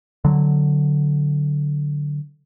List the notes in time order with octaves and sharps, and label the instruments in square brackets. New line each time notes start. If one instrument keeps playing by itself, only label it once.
[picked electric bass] D3 F#3